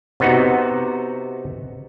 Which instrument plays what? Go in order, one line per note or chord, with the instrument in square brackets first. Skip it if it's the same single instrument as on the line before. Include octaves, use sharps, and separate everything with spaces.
[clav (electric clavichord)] C3 B3 D#4 F#4